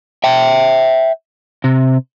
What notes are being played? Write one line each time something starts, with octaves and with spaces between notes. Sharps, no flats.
E5 G5
C3